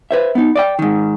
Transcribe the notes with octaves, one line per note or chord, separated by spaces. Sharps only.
B4 C5 E5
B3 D#4
D5 D#5 G5
G#2 D#3